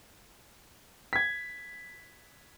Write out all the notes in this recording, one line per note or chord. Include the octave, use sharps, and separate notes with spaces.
G#6 B6